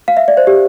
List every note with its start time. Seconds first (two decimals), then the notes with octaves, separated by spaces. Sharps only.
0.08 F5
0.17 E5
0.28 D5
0.37 C5
0.47 G4